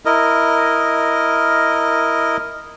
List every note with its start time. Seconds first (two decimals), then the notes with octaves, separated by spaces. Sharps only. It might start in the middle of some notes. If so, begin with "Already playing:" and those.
0.05 E4 A#4 D#5